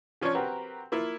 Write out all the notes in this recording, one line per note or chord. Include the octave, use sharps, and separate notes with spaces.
F3 C#4 D4 F4 C#5
C4 F#4 G4 A#4 B4
A#3 E4 F4